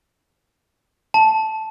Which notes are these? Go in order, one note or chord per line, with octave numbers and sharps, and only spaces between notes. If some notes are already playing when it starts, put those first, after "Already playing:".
A5